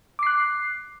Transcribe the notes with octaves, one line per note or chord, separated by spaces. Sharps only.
D6 F#6 C7